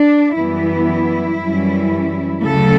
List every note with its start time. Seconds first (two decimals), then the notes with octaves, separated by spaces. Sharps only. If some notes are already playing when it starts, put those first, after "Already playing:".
Already playing: D4
0.34 F#2 E3 G3 B3 E4
1.40 F#2 E3 G3 C#4
2.45 D2 C#3 F#3 A3 A4